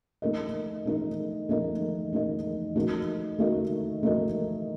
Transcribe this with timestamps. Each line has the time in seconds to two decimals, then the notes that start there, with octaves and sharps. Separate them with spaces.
0.22 A3 D#4 A#4 D#5
0.85 A3 D#4 A#4 D#5
1.49 A3 D#4 A#4 D#5
2.12 A3 D#4 A#4 D#5
2.76 A3 D#4 F#4 A#4 D#5
3.39 A3 D#4 F#4 A#4 D#5
4.03 A3 D#4 F#4 A#4 D#5